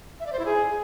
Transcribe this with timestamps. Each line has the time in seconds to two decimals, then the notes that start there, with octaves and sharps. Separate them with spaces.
0.20 E5
0.26 D5
0.33 C5
0.39 E4
0.45 G#4